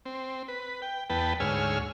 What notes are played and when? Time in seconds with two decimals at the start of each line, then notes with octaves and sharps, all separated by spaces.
0.05 C4
0.48 B4
0.82 G5
1.10 E2 B3 B4 G5 A5
1.40 D2 G#2 C#5 G#5 E6 F6